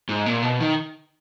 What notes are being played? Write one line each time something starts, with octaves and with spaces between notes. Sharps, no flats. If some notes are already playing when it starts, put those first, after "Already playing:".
G#2
A#2
B2
D#3